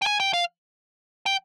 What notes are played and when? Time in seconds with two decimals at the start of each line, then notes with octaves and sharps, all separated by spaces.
0.02 G5
0.06 G#5
0.20 G5
0.33 F5
1.26 G5